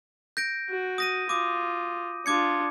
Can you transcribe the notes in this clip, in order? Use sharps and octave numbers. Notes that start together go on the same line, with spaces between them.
G6 A#6 D7
F#4
D#6 A#6 D#7
F4 D6 D#6
D4 F4 D6 G#6 C#7